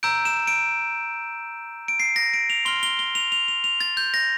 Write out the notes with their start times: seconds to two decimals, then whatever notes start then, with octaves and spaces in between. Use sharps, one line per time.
0.03 A#5 E6 G6 D7
0.25 E7
0.47 D7
1.88 D7
2.00 C7
2.16 A#6
2.34 D7
2.50 F7
2.65 C6 F6 G7
2.83 G7
2.99 G7
3.15 F7
3.32 F7
3.48 F7
3.64 F7
3.80 A6
3.97 G6
4.14 A#6